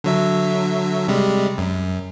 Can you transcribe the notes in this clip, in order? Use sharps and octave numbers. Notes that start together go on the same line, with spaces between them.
D3 F#3 E5
C3 G3 G#3
F#2